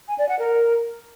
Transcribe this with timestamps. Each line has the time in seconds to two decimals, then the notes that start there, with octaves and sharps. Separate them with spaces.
0.08 G#5
0.18 D5
0.29 F#5
0.39 A#4